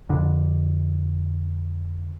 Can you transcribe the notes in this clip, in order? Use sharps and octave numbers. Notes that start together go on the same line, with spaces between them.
F2 D3